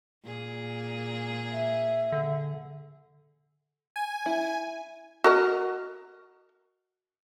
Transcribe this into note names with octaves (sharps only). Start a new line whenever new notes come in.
A#2 G#4
E5
D3
G#5
E4
F#4 A#4 D#5